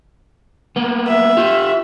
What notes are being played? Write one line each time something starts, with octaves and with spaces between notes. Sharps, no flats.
A#3 B3
E5
F4 G4